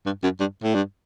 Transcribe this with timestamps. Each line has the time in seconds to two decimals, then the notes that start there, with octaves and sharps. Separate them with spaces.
0.06 G2
0.23 F#2
0.40 G2
0.63 A2
0.74 G2